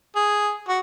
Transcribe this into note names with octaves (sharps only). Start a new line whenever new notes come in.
G#4
F#4